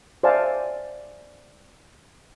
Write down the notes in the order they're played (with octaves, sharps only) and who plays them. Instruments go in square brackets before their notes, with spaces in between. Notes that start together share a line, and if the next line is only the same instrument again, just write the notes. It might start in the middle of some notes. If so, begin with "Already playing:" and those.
[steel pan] C5 D5 E5 F5 G#5 A5